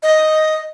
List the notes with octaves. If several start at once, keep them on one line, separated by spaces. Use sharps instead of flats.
D#5